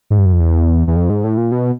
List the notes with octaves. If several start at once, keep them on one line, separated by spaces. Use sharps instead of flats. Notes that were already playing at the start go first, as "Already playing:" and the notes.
G#2
G2
F#2
F2
E2
E2
F2
G#2
A2
A#2
B2